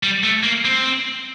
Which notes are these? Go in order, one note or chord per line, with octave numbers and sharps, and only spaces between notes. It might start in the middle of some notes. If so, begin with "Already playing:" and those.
G3
A3
A#3
C4